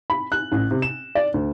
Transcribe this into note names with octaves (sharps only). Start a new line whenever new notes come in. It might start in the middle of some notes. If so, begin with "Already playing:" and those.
B5
F#6
A1
C3
E7
D5
D2